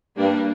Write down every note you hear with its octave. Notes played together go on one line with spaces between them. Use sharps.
G2 G3 A#3 D4